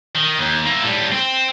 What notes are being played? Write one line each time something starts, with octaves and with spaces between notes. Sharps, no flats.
D#3
D#2
A#3 E4
A2 G3
C4